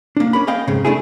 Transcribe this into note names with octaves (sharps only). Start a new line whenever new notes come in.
A#3 D4
C#4 A#4 B5
G#4 D#5 F5 G5
F2 G#2 C#3
A3 D4 E4 G#4